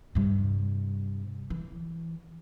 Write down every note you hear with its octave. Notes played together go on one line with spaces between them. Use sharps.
G2 C3
E3